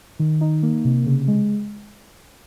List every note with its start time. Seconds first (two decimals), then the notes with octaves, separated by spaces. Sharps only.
0.19 D#3
0.41 D#4
0.63 A#3
0.85 C3
1.06 C#3
1.28 G#3